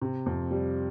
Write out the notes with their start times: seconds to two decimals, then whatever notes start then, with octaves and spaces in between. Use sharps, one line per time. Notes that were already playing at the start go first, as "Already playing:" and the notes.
0.01 C3
0.26 F2
0.51 G3